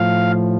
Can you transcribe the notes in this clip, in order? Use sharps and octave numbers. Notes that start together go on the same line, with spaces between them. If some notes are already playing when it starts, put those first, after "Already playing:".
Already playing: A2 F3 F5